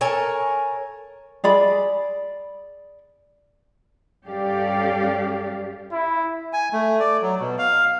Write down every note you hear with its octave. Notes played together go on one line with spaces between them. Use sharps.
A4 A#4 C#5 G#5
G#4 D5 B5
G2 C#4 G4 A4 D5 F5
E4
G#5
A3
D5
F#3
B2
F5